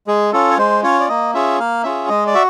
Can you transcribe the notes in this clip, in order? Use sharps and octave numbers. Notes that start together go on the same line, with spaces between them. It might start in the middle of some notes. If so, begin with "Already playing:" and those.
G#3 G#4
C#4 F4 A4
C#5
G#3 C5
C#4 F4 C#5
D5
A#3 D#5
C#4 F4 G#4 E5
A#3 F5
C#4 F4 G#4 E5
G#3 D#5
D5
F#4 E5